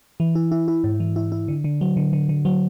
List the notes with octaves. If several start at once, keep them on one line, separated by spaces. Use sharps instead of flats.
E3
E4
E4
E4
G#2
E3
E4
E4
D3
D3
F#3
D3
D3
D3
F#3